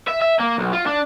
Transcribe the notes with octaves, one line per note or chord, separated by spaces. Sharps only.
E5
E5
A#3
B1
F4
D4